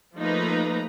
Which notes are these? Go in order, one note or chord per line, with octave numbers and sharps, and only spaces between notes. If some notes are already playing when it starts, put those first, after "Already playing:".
F3 A3 A#3 D#4 B4 A#5